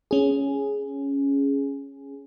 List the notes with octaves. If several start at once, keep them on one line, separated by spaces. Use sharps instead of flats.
C#4 G#4